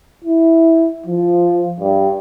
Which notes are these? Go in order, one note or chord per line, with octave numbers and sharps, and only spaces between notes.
E4
F3
G2